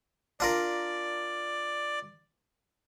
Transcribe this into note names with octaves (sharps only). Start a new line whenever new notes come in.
D4 F4 A#4 D5